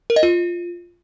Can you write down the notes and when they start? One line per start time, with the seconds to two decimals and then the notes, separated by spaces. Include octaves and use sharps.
0.10 A#4
0.16 D#5
0.23 F4